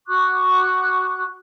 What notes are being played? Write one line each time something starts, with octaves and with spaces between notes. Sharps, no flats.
F#4 C#6 D6 F#6